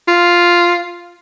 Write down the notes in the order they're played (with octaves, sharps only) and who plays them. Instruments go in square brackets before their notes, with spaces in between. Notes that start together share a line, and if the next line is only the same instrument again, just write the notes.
[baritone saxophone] F4